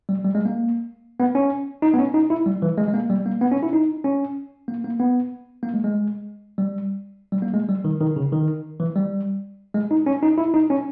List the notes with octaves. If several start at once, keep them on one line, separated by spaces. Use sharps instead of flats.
G3
G3
G#3
A#3
B3
C#4
D#4
B3
C#4
D#4
E4
G3
E3
G#3
G#3
A#3
G3
A#3
B3
C#4
E4
D#4
C#4
A#3
A#3
B3
A#3
G#3
G#3
G3
G3
A#3
G#3
G3
D#3
D#3
C#3
D#3
E3
G3
G#3
D#4
C#4
D#4
E4
D#4
C#4